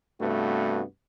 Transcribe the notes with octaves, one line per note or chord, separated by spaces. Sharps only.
G2 C3 A3 B3 F#4